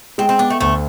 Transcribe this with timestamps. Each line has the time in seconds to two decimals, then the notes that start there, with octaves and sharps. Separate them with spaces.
0.18 G#3 C4
0.29 C4
0.39 B3 D4
0.50 A3
0.61 D2 A3